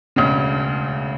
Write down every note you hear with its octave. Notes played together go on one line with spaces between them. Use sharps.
E1 D2 C#3